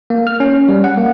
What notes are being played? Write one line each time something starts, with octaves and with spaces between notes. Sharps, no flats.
A#3
F6
C#4
G3
F#5
A#3